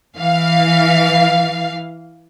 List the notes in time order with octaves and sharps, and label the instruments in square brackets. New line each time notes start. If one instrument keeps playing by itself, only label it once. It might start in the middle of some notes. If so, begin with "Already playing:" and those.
[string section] E3 F5